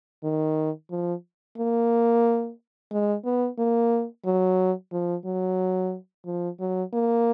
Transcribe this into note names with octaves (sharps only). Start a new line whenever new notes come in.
D#3
F3
A#3
G#3
B3
A#3
F#3
F3
F#3
F3
F#3
A#3